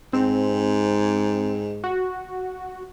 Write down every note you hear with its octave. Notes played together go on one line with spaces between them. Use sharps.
G#2 C4
F#4